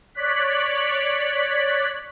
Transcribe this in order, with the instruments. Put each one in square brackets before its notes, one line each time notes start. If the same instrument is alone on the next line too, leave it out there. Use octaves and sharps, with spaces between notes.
[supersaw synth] C#5 D5 F#6 B6